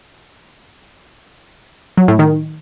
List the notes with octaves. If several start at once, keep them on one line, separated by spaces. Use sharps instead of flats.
F#3
A2
D#3